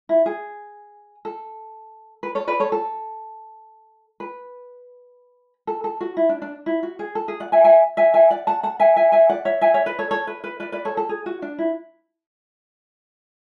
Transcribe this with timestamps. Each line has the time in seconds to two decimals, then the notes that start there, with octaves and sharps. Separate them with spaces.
0.09 E4
0.26 G#4
1.25 A4
2.23 B4
2.35 A4 C#5
2.48 B4 D5
2.60 A4 C#5
2.72 A4
4.20 B4
5.67 A4
5.84 A4
6.01 F#4
6.17 E4
6.29 D4
6.42 D4
6.66 E4
6.83 F#4
6.99 G#4
7.15 A4
7.28 G#4
7.40 D5 F#5
7.52 E5 G#5
7.64 E5 G#5
7.97 E5 G#5
8.14 E5 G#5
8.30 D5 F#5
8.47 F#5 A5
8.63 F#5 A5
8.80 E5 G#5
8.96 E5 G#5
9.12 E5 G#5
9.29 D5 F#5
9.45 C#5 E5
9.61 E5 G#5
9.74 C#5 E5
9.86 B4 D5
9.99 A4 C#5
10.11 A4 C#5
10.27 B4
10.44 B4
10.60 B4 D5
10.72 B4 D5
10.85 A4 C#5
10.97 A4
11.09 G#4
11.26 F#4
11.42 D4
11.58 E4